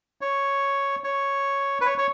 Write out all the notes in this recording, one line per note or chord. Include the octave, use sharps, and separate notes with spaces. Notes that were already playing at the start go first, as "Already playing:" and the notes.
C#5
C#5
B4
C#5
C#5